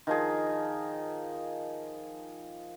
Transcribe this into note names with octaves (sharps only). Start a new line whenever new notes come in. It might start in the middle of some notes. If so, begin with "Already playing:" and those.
D#3 F3 G#4